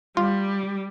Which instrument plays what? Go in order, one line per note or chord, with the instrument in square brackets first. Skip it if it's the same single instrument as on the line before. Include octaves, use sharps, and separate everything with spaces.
[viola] G3 [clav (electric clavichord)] F4